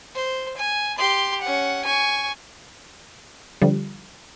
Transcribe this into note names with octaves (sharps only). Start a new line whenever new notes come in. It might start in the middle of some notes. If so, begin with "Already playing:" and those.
C5
G#5
G4 C6
C#4 F#5
G#5 C#6
D3 F3 G3